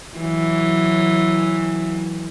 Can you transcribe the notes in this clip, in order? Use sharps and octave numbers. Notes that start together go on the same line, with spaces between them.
E3 F#3